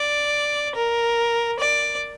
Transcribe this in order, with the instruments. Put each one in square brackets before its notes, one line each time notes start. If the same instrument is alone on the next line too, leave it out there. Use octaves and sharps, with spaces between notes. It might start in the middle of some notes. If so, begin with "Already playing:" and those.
Already playing: [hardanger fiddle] D5
A#4
D5